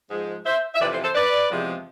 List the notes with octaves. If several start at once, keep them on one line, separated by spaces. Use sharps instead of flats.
G#2 F3 G#3
C5 E5
E5
F2 C3 E3 B4 D5
A4 C5
A4 C5
B4 D5
E2 C3 F3 G#3